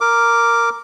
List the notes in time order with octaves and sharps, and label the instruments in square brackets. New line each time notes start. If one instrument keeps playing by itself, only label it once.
[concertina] A#4 D6